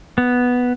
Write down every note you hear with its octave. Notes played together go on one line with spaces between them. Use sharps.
B3